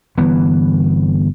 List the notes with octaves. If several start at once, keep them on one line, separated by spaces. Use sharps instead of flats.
G1 E3 B3